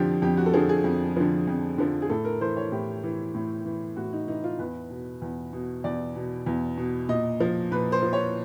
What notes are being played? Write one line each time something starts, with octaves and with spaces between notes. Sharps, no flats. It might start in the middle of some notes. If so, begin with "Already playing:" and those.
Already playing: F2 D3 F3 F4 G4
F2 G4
F#4
A4
D3 F3 G#4
G#4
F2
D3 F3
F2
D3 F3
G#4
A2 A4
A#4
E3 C5
C#5
A2 G4
E3
A2
E3
A2 F#4
D#4
E3 D#4
F4
E2 B4
B2
E2
B2
E2 D5
B2
E2
B2
A#2 D#5
F3
A#2 B4
C5
F3
C#5